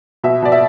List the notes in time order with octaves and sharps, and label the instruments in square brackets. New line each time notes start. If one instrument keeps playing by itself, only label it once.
[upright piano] B2 E5
B2 D5
E5